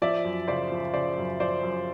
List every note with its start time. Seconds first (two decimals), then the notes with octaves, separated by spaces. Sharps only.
0.02 F3 D5 E5
0.24 F#2
0.47 C#3 C5 D5
0.72 F3
0.94 C#3 C5 D5
1.18 F#2
1.40 F3 C5 D5
1.63 F#2